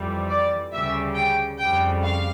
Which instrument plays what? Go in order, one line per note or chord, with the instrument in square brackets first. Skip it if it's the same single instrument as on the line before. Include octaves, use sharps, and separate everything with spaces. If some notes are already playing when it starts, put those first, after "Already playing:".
Already playing: [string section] F2 E3 G3
D5
D2 C#3 G3 E5
G5
F2 C#3 G3 G5
F5